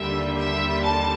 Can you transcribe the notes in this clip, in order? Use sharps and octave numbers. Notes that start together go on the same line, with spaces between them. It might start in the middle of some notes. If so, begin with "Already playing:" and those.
Already playing: D#2 D3 G3 A#3 E5
E5
A5